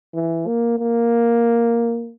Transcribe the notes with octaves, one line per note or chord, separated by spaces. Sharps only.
E3
A#3
A#3